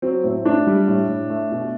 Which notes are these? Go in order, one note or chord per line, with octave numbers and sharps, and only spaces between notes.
F#3 C4
A2 C4
A3 D4
G3
A2
A2
A3
B2